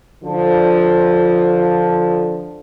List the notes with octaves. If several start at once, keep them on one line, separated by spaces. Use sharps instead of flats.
D3 F3